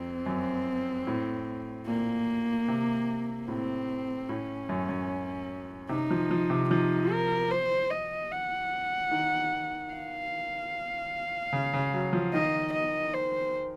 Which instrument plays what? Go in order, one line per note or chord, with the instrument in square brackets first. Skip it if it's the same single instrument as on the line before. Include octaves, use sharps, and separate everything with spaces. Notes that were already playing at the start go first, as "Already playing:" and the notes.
Already playing: [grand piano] F2 [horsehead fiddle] C4
[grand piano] F#2
A2
[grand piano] A#2 [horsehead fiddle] A#3
[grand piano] C3
[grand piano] A2 [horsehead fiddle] C4
[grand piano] A2 [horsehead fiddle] C#4
[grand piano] F#2
F#2
[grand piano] C3 [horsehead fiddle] D#4
[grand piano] F3
F3
C3
[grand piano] F3 [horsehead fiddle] D#4
[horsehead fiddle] A#4
C5
D#5
F#5
[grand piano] D#3
[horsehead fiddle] F5
[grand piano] C#3
C#3
F#3
F3
[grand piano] D#3 [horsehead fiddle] D#5
[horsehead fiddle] D#5
C5